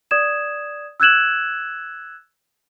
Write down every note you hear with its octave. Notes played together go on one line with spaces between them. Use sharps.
D5 D#6 G#6 E7
E6 F#6 G#6 E7 F#7